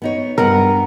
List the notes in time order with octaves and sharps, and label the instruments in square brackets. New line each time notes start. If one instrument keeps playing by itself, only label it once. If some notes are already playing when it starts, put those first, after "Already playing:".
[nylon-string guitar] B3 D#4 C#5
[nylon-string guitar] G2 B3 F#5 [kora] A#4